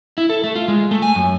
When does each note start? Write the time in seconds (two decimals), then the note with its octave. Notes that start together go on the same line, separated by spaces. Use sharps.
0.18 E4
0.30 A4
0.44 A3
0.56 F4
0.68 G#3
0.91 A3
1.02 G#5
1.15 F#2